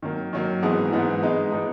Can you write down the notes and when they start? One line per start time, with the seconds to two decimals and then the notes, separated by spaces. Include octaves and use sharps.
0.02 D#3 F#3 A#3
0.33 D#3 F#3 A#3
0.62 G#2 E3 B3 D#4 G#4
0.92 G#2 E3 B3 D#4 G#4
1.23 E3 G#3 B3 D#4
1.52 E3 G#3 B3 D#4